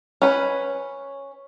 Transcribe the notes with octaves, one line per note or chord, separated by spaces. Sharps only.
C#4 B4